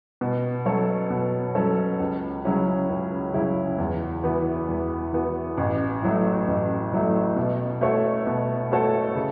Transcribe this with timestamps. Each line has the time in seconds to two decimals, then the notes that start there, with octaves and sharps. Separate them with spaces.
0.21 B2
0.65 F#3 C#4 A4 C#5
1.10 B2
1.55 F#3 C#4 A4 C#5
2.00 C#2
2.44 C#3 F#3 C#4 E4
2.89 C#2
3.34 C#3 F#3 C#4 E4
3.78 E2
4.24 E3 B3 F#4
4.68 E2
5.13 E3 B3 F#4
5.58 A1
6.02 A2 F#3 A3
6.48 A1
6.92 A2 F#3 A3
7.36 B2
7.81 A3 F#4 A4 C#5
8.27 B2
8.72 A3 F#4 A4 C#5
9.15 C#3